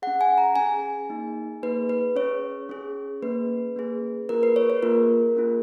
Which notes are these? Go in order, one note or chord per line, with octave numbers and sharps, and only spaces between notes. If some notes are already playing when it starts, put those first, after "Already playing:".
C#4 G#4 F#5
G#5
A#5
C#4 G#4 G#5
A#3 D#4 G#4
A#3 D#4 G#4 B4
B4
C#4 G#4 C#5
C#4 G#4
A#3 C#4 G#4 B4
A#3 C#4 G#4
A#3 F4 G#4 A#4
B4
C#5
C#5
A#3 F4 G#4 A#4
A#3 C#4 F4 G#4